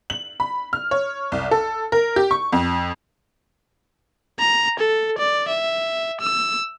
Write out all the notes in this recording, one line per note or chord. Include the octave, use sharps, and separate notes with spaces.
F#7
B5
F6
C#5
C2
A4
A#4
G4
C#6
F2
A#5
A4
D5
E5
E6